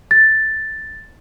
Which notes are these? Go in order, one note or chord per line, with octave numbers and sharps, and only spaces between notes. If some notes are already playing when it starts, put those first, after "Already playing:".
A6